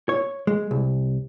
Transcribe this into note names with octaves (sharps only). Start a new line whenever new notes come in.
C#5
G#3
C2